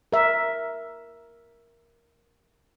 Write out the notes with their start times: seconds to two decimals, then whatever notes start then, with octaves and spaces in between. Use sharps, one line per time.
0.12 A#4 E5